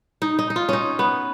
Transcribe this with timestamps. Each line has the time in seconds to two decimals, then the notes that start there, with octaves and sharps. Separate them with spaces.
0.22 D#4
0.39 D#4
0.50 D#4
0.56 F4
0.69 C#4 D#4
0.99 B3